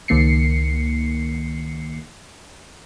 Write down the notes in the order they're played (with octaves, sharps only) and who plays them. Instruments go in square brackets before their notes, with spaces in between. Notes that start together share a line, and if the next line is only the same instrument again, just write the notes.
[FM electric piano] C#2 D#3 A#3 C7 C#7